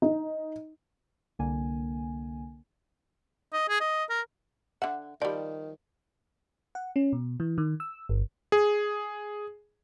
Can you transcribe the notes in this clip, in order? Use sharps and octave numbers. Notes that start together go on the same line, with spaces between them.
D#4
C2 D3 A#3 G#5
D#5
G#4
D#5
A#4
D3 E5 F#5
D#3 F3 G3 D5
F#5
C#4
B2
E3
D#3
E6
G1
G#4